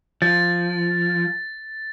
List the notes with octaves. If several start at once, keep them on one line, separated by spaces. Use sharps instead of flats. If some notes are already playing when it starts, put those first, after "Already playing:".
F3 A6